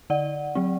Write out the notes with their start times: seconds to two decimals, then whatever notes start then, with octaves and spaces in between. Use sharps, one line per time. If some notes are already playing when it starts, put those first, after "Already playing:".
0.10 D3 D5 F#5
0.55 F#3 C4